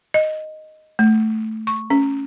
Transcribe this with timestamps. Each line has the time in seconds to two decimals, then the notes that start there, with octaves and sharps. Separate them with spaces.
0.14 D#5
0.99 A3
1.67 C#6
1.90 C#4